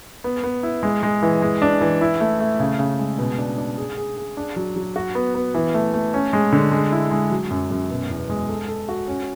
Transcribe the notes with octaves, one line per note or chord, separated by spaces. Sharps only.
B3
B3
E4
G#3
G#3
E3
G#3
D4
E3
E4
A3
A3
C#3
C#3
G#3
B2
D4
D4
G#4
G#4
G#4
D4
F#3
F#3
F#4
B3
B3
E3
A3
A3
C#4
G#3
D3
G#3
E4
G#3
F#3
F#2
F#2
B2
E2
G#3
A4
A4
F#4
C#4